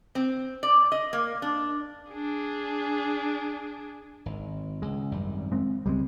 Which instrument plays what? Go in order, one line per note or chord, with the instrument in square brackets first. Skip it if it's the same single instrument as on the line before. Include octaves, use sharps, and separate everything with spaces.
[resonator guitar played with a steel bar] C4
D5
D#5
A#3
D4
[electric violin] D4 G#4
[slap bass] G#1
[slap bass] C#2 [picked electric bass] G#3
[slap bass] G#1 F#2 G3
[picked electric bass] G#3 C4
[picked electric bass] C#2 C4 [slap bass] G3 G#3